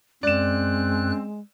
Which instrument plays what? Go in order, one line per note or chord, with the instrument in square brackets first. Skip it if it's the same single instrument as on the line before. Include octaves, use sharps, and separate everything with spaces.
[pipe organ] F#2 F#6 [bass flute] G#3 [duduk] C4 [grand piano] D5 E7